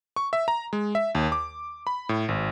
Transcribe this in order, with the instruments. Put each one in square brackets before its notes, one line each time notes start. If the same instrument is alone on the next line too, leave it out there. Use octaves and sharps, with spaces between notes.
[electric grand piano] C#6
E5
A#5
G#3
E5
D#2
D6
B5
A2
G#1